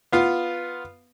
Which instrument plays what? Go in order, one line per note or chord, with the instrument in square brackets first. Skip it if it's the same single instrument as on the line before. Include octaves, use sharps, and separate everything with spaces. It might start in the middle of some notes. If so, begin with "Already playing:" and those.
[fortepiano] B3 F4 F5